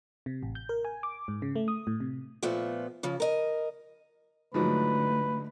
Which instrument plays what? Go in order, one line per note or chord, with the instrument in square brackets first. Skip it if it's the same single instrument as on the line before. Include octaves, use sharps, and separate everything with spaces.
[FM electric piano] C3
A1
G6
A#4
G#5
D6
G#2
C#3
A3
D#6
A2
C3
[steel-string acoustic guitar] A#2 F3 A3 B3
C#3 F3
A#4 D#5
[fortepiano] G#2 F3 F#3 [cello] D3 A3 [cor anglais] B4